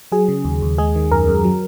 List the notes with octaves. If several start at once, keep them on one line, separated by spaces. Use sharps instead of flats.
F#3 G#4
C#3
D#2
D#2
G#3 G#4
D#3
F#2 A#4
F#2
F#3